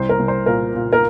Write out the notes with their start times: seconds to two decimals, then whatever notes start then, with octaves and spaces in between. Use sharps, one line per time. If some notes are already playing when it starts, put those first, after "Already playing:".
Already playing: C2 C5
0.09 A#4
0.19 C2
0.28 C5
0.46 A#2 A#4
0.75 A#2
0.93 A#4